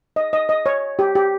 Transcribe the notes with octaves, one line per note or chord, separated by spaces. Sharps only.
D#5
D#5
D#5
C#5
G4
G4